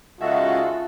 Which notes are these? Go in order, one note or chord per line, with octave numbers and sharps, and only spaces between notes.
C#3 G#3 D#4 F4 F#4 G#4 A4 E5